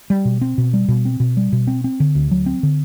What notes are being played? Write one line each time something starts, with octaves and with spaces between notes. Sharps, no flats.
G3
B2
C4
B2
G3
B2
C4
B2
G3
B2
C4
C4
D3
D2
F#3
C4
D3